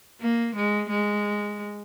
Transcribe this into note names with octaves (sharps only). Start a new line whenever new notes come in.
A#3
G#3
G#3